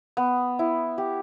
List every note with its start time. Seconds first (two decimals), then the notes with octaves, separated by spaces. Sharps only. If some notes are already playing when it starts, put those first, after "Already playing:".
0.17 B3
0.59 E4
0.98 G4